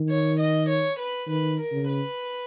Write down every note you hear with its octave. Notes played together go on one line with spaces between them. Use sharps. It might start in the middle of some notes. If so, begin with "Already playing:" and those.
Already playing: D#3
C#5
D#5
C#5
B4
D#3 B4
A#4
C#3
B4